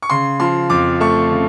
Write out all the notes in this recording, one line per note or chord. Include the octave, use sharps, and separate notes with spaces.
C#6
C#3 C6
F3 C6
F2 D6
A3 C#6
C#3